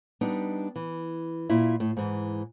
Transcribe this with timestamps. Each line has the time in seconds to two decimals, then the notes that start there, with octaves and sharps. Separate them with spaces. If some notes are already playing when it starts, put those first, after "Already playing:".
0.21 G3 B3 D4 D#4
0.76 E3
1.49 A#2 E4
1.80 A2
1.97 G#2 E3